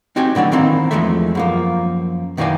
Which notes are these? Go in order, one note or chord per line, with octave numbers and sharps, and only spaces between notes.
C4 D#4 F#4 G4 G#5
A2 D3 F#3 D4
D#3 E3 A#3 C4 D#4
E2 D#3 F3 G#3 A3 E5
F#2 F3 A#3
F#2 D#3 E3 A#3 D5 G#5